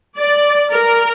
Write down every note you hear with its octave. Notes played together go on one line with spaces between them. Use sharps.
D5
A#4